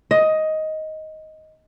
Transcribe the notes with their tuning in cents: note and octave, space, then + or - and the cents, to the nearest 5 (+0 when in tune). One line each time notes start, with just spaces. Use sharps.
D#5 +10